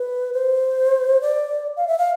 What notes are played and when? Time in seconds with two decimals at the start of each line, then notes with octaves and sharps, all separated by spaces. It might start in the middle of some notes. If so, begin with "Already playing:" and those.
Already playing: B4
0.33 C5
1.21 D5
1.77 F5
1.87 E5
1.98 F5